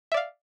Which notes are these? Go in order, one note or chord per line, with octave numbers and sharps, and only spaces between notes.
D5 E5 F5